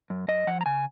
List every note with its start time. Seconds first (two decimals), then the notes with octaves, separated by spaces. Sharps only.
0.10 F#2
0.28 F#2 D#5
0.47 F3 F#5
0.61 A#5
0.66 C#3 G#5